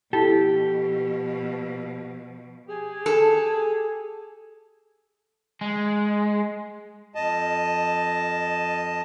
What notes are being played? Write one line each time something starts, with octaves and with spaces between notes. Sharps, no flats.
B2 F3 E4 G4 A4
G4 G#4
A4
G#3
F2 D#5 A5